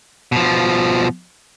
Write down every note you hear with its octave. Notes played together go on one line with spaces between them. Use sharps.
B2 F3